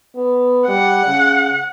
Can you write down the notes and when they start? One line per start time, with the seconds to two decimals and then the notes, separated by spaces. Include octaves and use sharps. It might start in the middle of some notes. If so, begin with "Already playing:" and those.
0.16 B3
0.68 G3 F#5
1.06 C#3